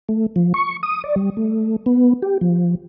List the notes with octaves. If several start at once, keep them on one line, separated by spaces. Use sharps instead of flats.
A3
F3
C#6
D#6
D5
G3
A3
B3
G4
F3